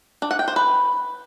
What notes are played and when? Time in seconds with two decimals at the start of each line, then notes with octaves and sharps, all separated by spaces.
0.22 D4
0.31 F#5
0.39 G5
0.48 C5
0.56 B4